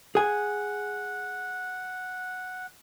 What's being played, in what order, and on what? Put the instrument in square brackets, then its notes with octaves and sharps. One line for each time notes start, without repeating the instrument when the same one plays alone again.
[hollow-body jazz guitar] G#4 G#5 [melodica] F#5